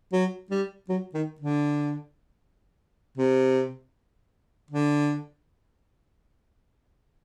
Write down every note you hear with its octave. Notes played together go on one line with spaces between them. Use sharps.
F#3
G3
F#3
D#3
D3
C3
D3